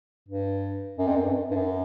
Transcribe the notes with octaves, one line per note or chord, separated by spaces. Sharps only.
G2
F#2
F2
F#2
G2
G2
F#2